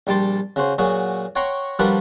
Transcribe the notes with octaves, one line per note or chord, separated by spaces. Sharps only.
A#1 G3 G5 A5 C6
C#3 F#4 C5
A#2 F#3 F#4 G#4
C#5 F#5 G5 A#5 C6 C#6
F3 G3 D4 F#4 A#4 B4